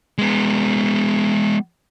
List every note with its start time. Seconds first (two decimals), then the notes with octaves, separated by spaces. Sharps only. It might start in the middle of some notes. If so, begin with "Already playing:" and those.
0.18 G#3 B3